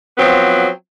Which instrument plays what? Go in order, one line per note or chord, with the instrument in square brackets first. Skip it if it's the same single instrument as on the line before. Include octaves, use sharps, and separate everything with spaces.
[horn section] F3 F#3 B3 C4